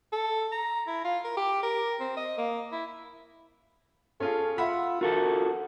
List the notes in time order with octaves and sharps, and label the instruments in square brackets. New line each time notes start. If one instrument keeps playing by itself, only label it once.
[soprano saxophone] A4
A#5
E4
F4
A#4
G4
A#4
C4
D#5
A#3
E4
[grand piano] C#4 F4 G#4 [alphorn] A4
[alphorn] F4 [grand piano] E5 F#5 B5
[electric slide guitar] F4 F#4 A4 [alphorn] A#4